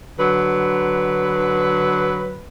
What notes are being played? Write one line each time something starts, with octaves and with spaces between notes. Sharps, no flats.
D3 F#3 B4